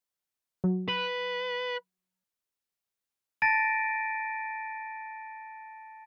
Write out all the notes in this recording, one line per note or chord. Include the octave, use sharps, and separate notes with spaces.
F#3
B4
A5 A6 A#6 D7 D#7